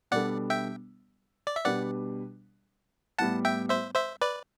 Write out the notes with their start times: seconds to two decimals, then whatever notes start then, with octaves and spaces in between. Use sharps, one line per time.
0.11 B2 G3 B3 D4 A4 D5 F#5
0.50 E5 G5
1.47 D5
1.56 E5
1.65 B2 G3 D4 G4 B4 D5 F#5
3.19 A2 G3 B3 E4 F#5 A5
3.45 E5 G5
3.70 C5 E5
3.95 C5 E5
4.21 B4 D5